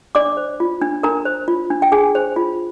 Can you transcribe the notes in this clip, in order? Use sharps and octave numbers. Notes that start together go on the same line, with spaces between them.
D4 D5 D6
C5
F4
D4
D4 A#4 A#5
C5
F4
D4
G5
D4 G#4 G#5
C5
F4